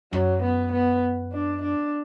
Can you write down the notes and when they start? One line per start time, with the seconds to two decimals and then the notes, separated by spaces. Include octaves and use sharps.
0.13 F#2 F#3
0.43 B3
0.72 B3
1.33 D4
1.63 D4